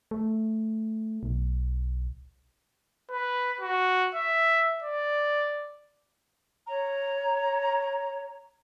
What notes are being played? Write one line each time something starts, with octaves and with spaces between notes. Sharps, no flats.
A3
B1
B4
F#4
E5
D5
C#5 A#5